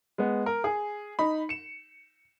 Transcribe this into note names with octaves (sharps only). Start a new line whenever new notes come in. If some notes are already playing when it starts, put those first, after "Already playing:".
G#3 B3
A#4
G#4
D#4 B5
C#7 E7